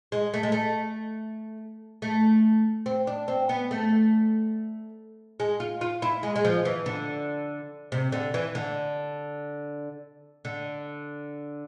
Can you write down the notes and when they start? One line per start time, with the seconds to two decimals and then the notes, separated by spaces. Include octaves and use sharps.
0.12 G#3
0.34 A3
0.43 G#3
0.52 A3
2.02 A3
2.86 C4
3.07 D4
3.28 C4
3.49 B3
3.71 A3
5.40 G#3
5.60 F4
5.81 F4
6.02 E4
6.23 G#3
6.36 G#3
6.45 F3
6.65 E3
6.86 D3
7.92 C3
8.12 D3
8.34 E3
8.55 D3
10.45 D3